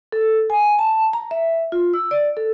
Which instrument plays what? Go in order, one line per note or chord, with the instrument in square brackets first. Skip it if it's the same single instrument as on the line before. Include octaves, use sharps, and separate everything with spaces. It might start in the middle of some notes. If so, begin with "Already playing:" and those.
[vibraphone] A4
G#5
A5
A#5
E5
F4
E6
D5
A4